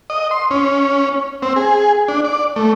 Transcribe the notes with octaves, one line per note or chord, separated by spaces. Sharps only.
D#5
C6
C#4
C4
G#4
D4
D5
A3